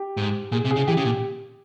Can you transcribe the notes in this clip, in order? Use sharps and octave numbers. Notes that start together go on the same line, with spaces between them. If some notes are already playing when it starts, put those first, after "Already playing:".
Already playing: G4
G#2
A#2 G#4
C3
G#4
C#3
E3 G4
C#3
A#2